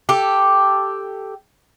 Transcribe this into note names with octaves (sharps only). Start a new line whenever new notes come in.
G4 A4